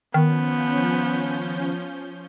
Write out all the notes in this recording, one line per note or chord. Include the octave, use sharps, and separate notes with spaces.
D#3 F3 B3 C#4 G6